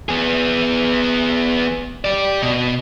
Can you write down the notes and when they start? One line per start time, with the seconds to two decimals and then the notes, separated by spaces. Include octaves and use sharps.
0.09 B3 G#4
2.05 G4 D5
2.42 B2